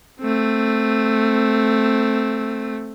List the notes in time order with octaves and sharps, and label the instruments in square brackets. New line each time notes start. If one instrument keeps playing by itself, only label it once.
[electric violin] A3 C4